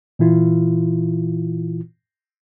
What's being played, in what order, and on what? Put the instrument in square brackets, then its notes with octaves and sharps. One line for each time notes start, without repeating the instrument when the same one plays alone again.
[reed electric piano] A#2 E3 E4 F4